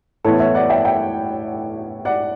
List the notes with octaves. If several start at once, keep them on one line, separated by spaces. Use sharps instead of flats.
A2 E3 B3 E4 A4 C#5
C#5 E5
D5 F#5
E5 G5
E5 G5
D5 F#5